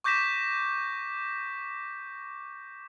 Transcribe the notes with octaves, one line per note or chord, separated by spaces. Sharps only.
C#6 D6 G6 A#6 B6 E7